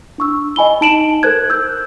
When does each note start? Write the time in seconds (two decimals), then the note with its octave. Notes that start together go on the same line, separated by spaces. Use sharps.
0.18 D4 C#6 E6
0.56 D#5 G#5 B5 G7
0.81 D#4 A5 D7 E7 F#7
1.23 A4 A#4 C5 F#6 G#6
1.50 E6 G6